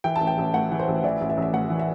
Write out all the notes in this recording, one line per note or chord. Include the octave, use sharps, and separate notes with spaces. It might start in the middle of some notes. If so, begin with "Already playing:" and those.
E3 G5
A5
A1
G5
A1
A2 F#5
E3
C5
A1
E3 D5
A1
E5
A1
E5
A2 F#5
E3
E5